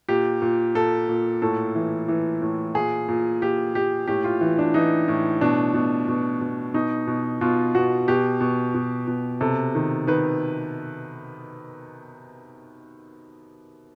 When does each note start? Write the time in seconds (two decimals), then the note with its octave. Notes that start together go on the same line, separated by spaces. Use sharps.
0.09 A#2 G4
0.42 A#2
0.75 A#2 A4
1.09 A#2
1.42 A2 A4
1.75 E3
2.08 E3
2.42 A2
2.74 A#2 G#4
3.08 A#2
3.41 A#2 G4
3.75 A#2 G4
4.08 A2 G4
4.24 F4
4.41 E3
4.59 D4
4.74 E3 D#4
5.08 A2
5.41 B2 D4
5.74 B2
6.09 B2
6.41 B2
6.74 B2 D#4
7.07 B2
7.41 B2 F4
7.75 B2 F#4
8.08 B2 G4
8.41 B2
8.74 B2
9.08 B2
9.41 C3 A4
9.75 D#3
10.07 D#3 B4